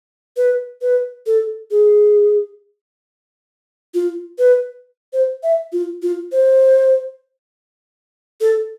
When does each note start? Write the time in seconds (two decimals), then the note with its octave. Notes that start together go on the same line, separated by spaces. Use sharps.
0.37 B4
0.82 B4
1.26 A4
1.71 G#4
3.94 F4
4.38 B4
5.13 C5
5.43 E5
5.73 F4
6.02 F4
6.32 C5
8.41 A4